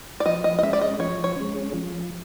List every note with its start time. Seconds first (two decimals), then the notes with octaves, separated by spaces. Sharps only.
0.20 D5
0.26 F3 D#5
0.44 D#5
0.59 D#5
0.63 G#3 C#4 E5
0.73 D5
0.81 D#5
0.99 F3 C#5
1.24 C#5
1.36 G#3 C#4
1.74 F3